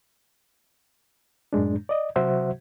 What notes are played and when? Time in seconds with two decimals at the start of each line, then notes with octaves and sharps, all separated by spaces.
1.53 F#2 A2 G#3 D4
1.89 D5 D#5
2.16 C3 F#3 F#4 C5 E5 F#5